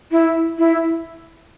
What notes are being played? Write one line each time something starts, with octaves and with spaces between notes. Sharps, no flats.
E4
E4